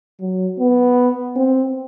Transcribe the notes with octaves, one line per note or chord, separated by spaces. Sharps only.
F#3
B3
C4